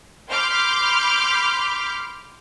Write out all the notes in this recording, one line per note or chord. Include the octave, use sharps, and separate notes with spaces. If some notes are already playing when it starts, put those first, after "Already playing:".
B5 C6 D6 F6 G6